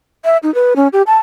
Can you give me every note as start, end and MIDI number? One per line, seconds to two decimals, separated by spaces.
0.25 0.37 76
0.43 0.53 63
0.54 0.73 71
0.76 0.88 61
0.93 1.02 67
1.07 1.18 81